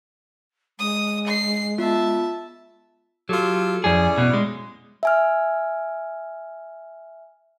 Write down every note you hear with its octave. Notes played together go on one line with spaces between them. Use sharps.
G#3 D#6
C7
B3 F4 E5 A5
F#3 F4 G4 A4
F2 C#4 E4 G#4 D5
B2
G#3
E5 G#5 F6